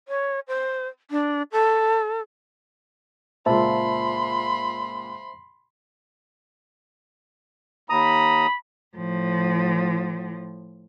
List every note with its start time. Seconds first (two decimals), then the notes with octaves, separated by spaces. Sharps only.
0.08 C#5
0.48 C5
1.11 D4
1.52 A4
3.46 C#2 A#2 C5 E5 A5 B5 C6
7.90 D#2 A#5 B5 D#6
8.97 A2 F3